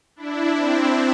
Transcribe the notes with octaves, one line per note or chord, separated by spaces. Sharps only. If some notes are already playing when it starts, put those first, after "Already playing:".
D4 E4
C4 D4